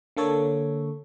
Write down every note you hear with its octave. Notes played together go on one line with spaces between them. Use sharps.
D3 A#3 A4 C#5